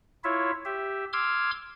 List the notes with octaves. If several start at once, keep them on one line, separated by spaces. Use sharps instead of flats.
E4 F4 C#5 E5
G4 E5
C6 D6 E6 F6 G#6